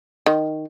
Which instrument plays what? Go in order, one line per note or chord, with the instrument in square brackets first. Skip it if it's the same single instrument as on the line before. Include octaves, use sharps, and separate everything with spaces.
[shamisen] D#3